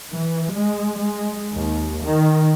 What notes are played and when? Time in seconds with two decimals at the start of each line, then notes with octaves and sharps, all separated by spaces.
0.11 E3
0.53 G#3
0.98 G#3
1.55 D#2
2.04 D#3